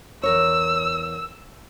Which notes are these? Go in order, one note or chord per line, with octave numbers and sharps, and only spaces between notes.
E2 A#4 C#5 E6